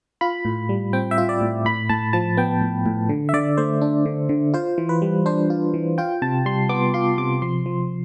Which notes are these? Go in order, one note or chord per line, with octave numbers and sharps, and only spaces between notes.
F4 B5
A2
G3
C4 G5
E5
F4
D5
A2
A2 B5
A2 A5
F3 A5
B3 G5
A2
A2
D3
E5
D3 D5
A3 C5
D4
D3
D3
F4 C5
E3
B4
G3
D4 C5
F4
E3
F4 G5
C3 A5
G3 C6
B3 D6
F4 C6
C3 D6
F3 C6
F3